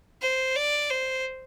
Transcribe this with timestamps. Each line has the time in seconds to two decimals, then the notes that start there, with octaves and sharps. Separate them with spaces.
0.22 C5
0.56 D5
0.91 C5